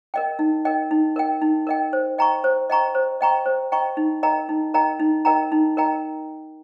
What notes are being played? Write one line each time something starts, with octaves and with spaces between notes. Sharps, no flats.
A#4 D#5 G5
D#4
A#4 D#5 G5
D#4
A#4 D#5 G5
D#4
A#4 D#5 G5
C5
D#5 G5 A#5 C#6
C5
D#5 G5 A#5 C#6
C5
D#5 G5 A#5 C#6
C5
D#5 G5 A#5 C#6
D#4
A#4 D#5 G5 A#5
D#4
A#4 D#5 G5 A#5
D#4
A#4 D#5 G5 A#5
D#4
A#4 D#5 G5 A#5